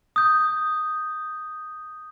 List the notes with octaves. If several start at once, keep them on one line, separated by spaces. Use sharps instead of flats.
D#6 G6